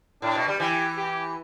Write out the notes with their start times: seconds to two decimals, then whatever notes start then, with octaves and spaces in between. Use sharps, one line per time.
0.22 A2 D4
0.35 B2
0.48 G3
0.60 E3 G4
0.97 G4